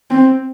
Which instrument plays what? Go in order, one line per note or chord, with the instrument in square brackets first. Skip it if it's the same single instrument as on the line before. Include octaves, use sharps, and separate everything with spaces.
[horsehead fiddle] C4